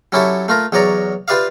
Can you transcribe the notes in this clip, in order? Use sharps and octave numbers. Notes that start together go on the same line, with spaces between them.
F#3 C#4 E4 G4 A4 E5
A3 F4 A#4
E2 F#3 C#5 D5 A#5
F4 G4 B4 D5 E5 F5